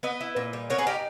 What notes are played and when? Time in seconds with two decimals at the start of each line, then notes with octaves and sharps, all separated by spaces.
0.03 B3 B4 D#5
0.21 E4
0.36 A#2
0.53 G3
0.70 B3 A#4 C#5
0.78 G#4 B4
0.87 D#4 G4 A#4